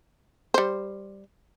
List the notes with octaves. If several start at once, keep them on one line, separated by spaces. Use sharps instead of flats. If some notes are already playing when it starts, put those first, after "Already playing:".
G3 C5